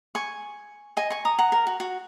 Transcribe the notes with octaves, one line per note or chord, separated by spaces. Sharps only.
G#5 C#6
D#5 G#5
G#5 C#6
A#5 D#6
F#5 A#5
A#4
F#4
F#4